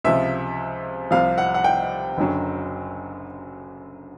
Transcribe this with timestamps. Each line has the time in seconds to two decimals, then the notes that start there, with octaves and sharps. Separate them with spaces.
0.04 C#2 C3 F3 E5
1.11 C2 C3 F3 F5
1.38 F#5
1.54 F#5
1.64 G5
2.18 F#1 F#2 D3 F#3